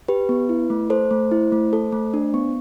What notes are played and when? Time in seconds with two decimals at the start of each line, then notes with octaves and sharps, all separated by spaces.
0.08 G4 B4
0.29 B3
0.49 E4
0.70 A3
0.90 A4 C5
1.11 A3
1.31 E4
1.52 A3
1.73 A4
1.92 A3
2.14 D4
2.34 B3